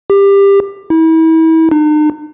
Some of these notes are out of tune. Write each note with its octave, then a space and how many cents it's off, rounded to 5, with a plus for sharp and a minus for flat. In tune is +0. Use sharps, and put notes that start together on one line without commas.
G4 +20
E4 -35
D#4 -45